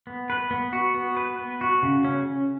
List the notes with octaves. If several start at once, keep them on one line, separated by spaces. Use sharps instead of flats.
B3
B4
B3
F#4
B3
B4
B3
F#4
C#3
C#4